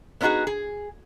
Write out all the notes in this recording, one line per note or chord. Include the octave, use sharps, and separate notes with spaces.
B3 C#4 D#4 F4 F#4 G#4
G#4